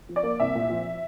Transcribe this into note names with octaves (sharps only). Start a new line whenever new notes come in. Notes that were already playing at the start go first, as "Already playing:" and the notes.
F3
D5
A#3
C2 E5
A#2
F3